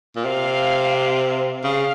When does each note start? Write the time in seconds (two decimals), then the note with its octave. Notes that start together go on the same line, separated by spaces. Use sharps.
0.16 A#2
0.25 C3 F5
1.64 C#3 F5